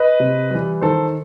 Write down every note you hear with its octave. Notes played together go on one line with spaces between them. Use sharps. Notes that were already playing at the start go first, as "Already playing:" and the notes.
Already playing: B4 D#5
C3
E3 G3
D#3 A4 C5